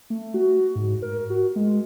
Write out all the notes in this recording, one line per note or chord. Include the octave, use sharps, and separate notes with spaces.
A3
F#4
G#2
A#4
F#4
G#3